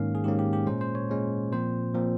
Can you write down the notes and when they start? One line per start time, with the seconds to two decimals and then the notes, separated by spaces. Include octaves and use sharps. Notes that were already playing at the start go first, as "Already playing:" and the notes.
Already playing: G#2 D#3 A#3 C#4 F5
0.15 G#4
0.24 G#2 D#3 A#3 C#4 G4
0.39 G4
0.53 G4
0.67 A#2 G#3 C#4 C5
0.81 C5
0.95 C#5
1.09 A#2 G#3 C#4
1.52 A#2 F3 C4 C5
1.95 A#2 F3 C4